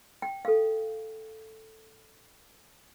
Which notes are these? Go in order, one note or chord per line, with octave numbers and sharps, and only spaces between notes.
G5
A4 F5